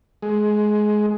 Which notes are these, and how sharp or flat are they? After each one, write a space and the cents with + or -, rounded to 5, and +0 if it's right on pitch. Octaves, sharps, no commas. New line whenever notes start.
G#3 +20